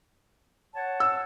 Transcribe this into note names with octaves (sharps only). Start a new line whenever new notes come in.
C#5 F#5 A5
E6